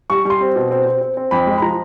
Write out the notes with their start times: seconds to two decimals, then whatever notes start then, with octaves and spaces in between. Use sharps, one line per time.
0.10 G3 C#6
0.25 G3 C6
0.41 C4
0.56 B2
0.71 C4
0.86 C4
1.01 C4
1.17 C4
1.31 F2 B5
1.47 G#3
1.58 B5
1.62 F3 A#5